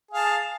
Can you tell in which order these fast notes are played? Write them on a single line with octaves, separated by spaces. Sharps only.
G#4 F5 A5